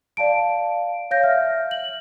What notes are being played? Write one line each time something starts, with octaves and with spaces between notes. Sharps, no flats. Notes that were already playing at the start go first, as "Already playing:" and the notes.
D5 F5 A5 D7
C#5 F5 G6 A#6
E5 F6
F#7